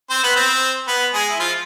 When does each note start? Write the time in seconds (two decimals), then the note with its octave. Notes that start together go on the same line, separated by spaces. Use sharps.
0.10 C4 C5
0.23 B3 B4
0.36 C4 C5
0.88 B3 B4
1.14 G#3 G#4
1.30 E4
1.40 F3 F4